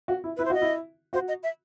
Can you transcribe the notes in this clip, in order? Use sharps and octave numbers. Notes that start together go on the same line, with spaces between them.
F#4
E4
E4 B4
C5
F#4 D#5
E4
F#4 C5
D#5
E5